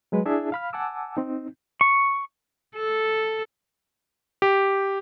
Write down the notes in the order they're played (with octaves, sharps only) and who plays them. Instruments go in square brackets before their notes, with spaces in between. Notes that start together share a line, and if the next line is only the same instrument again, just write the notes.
[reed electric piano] F#3 G#3 B4
D4 E4 G#4 E5 A5
F5 B5 F6
F#5 G#5 A5 D6 E6
C4 D#4
[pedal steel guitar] C#6
[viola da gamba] A4
[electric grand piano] G4